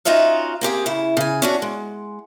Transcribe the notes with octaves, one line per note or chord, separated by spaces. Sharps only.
C#4 D#4 F4 F#4 E5 F5
A#3 C4 G4 G#4
C#3 E4
C#3 G#5
C#4 D4 F#4
G#3